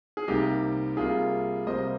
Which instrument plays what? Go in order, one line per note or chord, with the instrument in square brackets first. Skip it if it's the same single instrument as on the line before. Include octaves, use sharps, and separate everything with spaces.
[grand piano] G#4
C2 C3 G3 A#3 D#4 G4
C2 C3 G3 A#3 F4 G#4
C2 C3 G3 A#3 C5 D#5